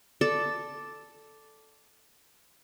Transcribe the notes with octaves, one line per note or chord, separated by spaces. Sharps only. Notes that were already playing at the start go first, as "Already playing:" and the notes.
A4 D5